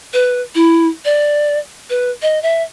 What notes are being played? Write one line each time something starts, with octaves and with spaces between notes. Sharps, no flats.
B4
E4
D5
B4
D#5
E5